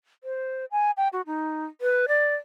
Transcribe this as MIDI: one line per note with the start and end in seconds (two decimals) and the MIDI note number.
0.24 0.65 72
0.71 0.91 80
0.97 1.08 79
1.13 1.22 66
1.27 1.66 63
1.81 2.06 71
2.08 2.35 74